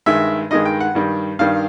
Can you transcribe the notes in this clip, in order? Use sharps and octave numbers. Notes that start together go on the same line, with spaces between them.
G2 D#3 G#3 E5
G2 D#3 G#3 D#5
G5
F#5
G2 D#3 G3
G2 D#3 G3 F5